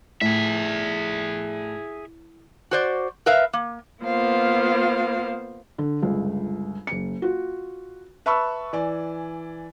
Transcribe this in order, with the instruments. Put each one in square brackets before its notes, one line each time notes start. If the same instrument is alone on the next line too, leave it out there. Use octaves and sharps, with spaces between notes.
[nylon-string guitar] A2 [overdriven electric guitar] G#4 E5
[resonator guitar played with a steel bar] F#4 C5 D5
A#4 B4 E5 F5
A#3
[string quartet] A#3 B3 F4 C5 F5
[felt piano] D3
G1 C#2
F#1 C#7
F4 F#4
B4 E5 A5 B5 C#6 E6
E3 D5 G#5